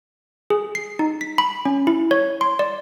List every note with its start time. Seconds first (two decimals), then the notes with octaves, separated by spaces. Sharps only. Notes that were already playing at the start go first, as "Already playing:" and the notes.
0.50 G#4
0.75 C7
0.99 D#4
1.21 B6
1.38 B5
1.65 C#4
1.87 E4
2.11 C#5
2.41 C6
2.59 D5